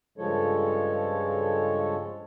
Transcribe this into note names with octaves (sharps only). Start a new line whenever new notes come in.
G2 C#3 F3 G#3 A4 C#5